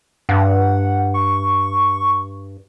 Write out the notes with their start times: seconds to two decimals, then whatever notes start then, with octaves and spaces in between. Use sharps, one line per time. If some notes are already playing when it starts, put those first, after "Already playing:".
0.29 G2 F#5
1.14 C#6